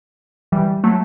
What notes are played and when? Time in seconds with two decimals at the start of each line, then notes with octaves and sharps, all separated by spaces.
0.52 E3 G3
0.84 F#3 A3